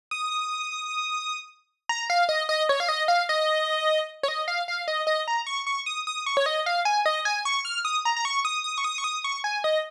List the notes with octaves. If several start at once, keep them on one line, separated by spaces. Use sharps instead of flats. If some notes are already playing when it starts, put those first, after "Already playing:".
D#6
A#5
F5
D#5
D#5
C#5
F5
D#5
F5
D#5
C#5
D#5
F5
F5
D#5
D#5
A#5
C#6
C#6
D#6
D#6
C#6
C#5
D#5
F5
G#5
D#5
G#5
C#6
F6
D#6
A#5
A#5
C#6
D#6
D#6
C#6
D#6
C#6
D#6
C#6
G#5
D#5